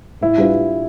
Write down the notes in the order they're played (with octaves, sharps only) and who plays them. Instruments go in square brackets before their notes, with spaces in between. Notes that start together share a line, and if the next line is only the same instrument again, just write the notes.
[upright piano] A2 [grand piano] E4
[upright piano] G3 D4 F4 B4